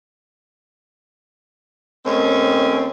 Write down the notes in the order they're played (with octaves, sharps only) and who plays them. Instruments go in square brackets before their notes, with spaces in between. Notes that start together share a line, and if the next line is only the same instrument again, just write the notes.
[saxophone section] D#2 D#3 A3 C4 C#4